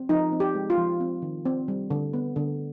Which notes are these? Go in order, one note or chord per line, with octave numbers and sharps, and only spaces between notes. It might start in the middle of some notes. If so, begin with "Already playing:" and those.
Already playing: C4
F3 D#4
C4
G4
G#3
F4
F3
C4
D#3
C4
G3
D3
B3
D3